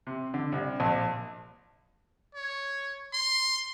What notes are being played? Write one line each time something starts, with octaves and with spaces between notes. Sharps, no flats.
C3
D3
C2
A#1
C#5
C6